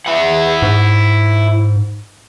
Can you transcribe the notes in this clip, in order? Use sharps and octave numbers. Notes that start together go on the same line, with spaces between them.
E4 F#5
G#2